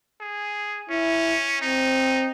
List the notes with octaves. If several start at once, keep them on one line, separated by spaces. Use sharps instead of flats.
G#4
C#4 E4
C4 D#4